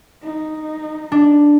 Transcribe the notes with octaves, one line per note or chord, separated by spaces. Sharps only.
D#4
D4